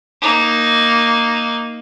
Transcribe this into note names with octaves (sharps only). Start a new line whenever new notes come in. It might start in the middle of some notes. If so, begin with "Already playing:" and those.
A#3 D#4